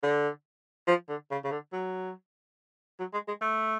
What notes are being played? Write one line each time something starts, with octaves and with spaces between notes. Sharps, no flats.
D3
F3
D3
C#3
C#3
D3
F#3
F#3
G#3
G#3
A3